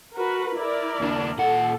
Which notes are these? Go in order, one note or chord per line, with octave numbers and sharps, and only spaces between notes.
F#4 A#4 B4
E4 A#4 D5
D#2 D4
A#2 A4 F#5